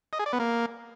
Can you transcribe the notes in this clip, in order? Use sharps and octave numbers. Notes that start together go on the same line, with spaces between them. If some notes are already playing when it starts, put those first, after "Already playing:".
D#5
G#4
D5
B3
A#3